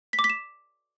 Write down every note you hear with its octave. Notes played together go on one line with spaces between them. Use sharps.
B6
D6
B6
E7